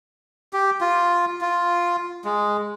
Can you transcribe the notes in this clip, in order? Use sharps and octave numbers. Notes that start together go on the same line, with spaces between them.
G4
F4
F4
G#3